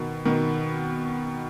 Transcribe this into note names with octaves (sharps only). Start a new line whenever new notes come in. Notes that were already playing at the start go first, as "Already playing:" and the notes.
Already playing: B2 D#3
B2 D#3